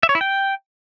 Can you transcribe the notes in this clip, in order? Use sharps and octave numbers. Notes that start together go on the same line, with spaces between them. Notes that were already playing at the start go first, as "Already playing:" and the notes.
E5
C#5
E4
G5